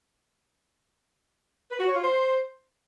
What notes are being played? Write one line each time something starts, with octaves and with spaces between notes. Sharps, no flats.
B4
F#4
C#5
F4
C5